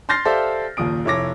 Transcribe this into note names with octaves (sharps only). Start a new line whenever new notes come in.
C6 F6 G6 A6 A#6 C7
G4 A4 C5 D5 E5 F5
F#1 D#2 A#2 D#6 D7
F1 E4 C#5 D6 A#6